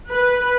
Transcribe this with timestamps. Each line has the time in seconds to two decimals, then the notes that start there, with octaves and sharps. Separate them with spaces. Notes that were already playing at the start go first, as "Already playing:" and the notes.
0.09 B4